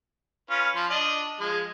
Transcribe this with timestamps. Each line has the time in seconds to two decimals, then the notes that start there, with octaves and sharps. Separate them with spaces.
0.50 C#4 F4 B4
0.76 F3 C6
0.90 D4 D#5
1.40 F3 G#3